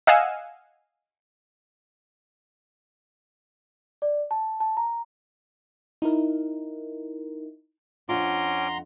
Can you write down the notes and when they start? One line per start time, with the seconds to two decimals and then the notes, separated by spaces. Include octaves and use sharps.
0.07 D#5 F5 F#5 G#5 E6
4.02 D5
4.31 A5
4.60 A5
4.77 A#5
6.02 D#4 E4 A#4
8.09 F2 C#4 D4 F4 F#5 A#5 C6 D6